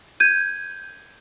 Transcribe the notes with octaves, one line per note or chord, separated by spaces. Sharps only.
G6 G#6 D#7